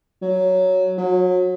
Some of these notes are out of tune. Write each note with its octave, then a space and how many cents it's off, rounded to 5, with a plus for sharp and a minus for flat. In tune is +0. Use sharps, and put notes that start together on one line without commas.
F#3 +5
F#3 -30